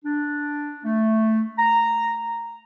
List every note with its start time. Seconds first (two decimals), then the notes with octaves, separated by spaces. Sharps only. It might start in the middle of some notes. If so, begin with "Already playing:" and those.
0.05 D4
0.85 A3
1.59 A#5